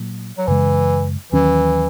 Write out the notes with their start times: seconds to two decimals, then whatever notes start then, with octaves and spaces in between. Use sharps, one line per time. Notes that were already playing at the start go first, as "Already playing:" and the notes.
Already playing: A#2 F#3 A#3
0.38 F#3
0.47 F#2 C#3 E3 G#3
1.32 D#2 D#3 E3 F#3 C#4